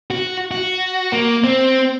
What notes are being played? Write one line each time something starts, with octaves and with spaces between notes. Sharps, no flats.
F#4
F#4
A#3
C4